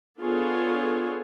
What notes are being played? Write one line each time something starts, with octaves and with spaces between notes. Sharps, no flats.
B3 D4 F4 G#4 A4 C#5